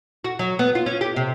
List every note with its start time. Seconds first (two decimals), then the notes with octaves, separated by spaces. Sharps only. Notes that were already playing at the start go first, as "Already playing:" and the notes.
0.24 F#4
0.39 F#3
0.59 B3
0.75 F4
0.86 C#4
1.01 G4
1.16 C3